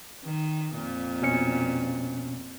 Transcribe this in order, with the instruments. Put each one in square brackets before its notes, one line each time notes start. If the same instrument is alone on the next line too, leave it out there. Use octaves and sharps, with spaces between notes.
[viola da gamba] D#3
F2 A#2
[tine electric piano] B2 C#4 C#7